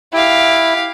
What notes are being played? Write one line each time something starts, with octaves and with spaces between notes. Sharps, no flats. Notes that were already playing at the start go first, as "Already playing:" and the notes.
E4 G4 F5